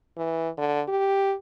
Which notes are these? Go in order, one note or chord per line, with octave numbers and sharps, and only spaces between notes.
E3
D3
G4